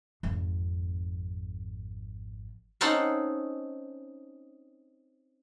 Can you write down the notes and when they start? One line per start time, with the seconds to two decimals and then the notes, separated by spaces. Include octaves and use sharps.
0.23 G#1 F2
2.81 C4 C#4 D#4 A4 C5 F#5